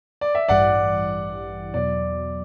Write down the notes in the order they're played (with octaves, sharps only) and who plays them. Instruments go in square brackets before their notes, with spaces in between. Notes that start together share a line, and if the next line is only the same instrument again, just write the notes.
[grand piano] D5
E5
[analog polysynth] A1 G2 E3 G3 [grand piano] D5 F#5
[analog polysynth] E2 B2 F#3 [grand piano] D5